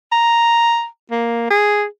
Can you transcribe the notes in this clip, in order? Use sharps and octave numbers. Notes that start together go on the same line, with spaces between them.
A#5
A#3
G#4